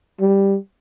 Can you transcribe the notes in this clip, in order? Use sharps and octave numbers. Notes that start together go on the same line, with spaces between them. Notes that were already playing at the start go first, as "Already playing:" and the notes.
G3